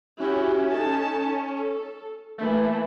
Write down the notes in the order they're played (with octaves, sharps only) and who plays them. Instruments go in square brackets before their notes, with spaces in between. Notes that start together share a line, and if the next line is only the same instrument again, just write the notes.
[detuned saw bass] C#4 [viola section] E4 F#4 G4
[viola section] D#4 A4 A5
A4
[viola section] E3 A#3 E4 [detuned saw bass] A3